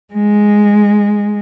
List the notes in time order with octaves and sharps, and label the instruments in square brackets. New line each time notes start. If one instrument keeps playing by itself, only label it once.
[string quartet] G#3